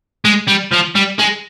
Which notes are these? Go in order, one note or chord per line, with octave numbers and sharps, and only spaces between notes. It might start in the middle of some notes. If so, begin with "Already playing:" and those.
G#3
G3
F3
G3
G#3